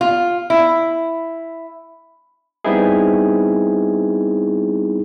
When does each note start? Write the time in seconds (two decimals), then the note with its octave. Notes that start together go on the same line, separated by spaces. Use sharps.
0.01 F4
0.50 E4
2.64 G3 B3 C4 D#4 E4 G#4